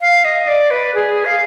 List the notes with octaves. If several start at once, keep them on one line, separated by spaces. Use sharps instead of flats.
F5
D#5
D5
B4
G#4
F5